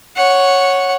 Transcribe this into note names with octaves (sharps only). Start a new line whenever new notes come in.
C#5 F#5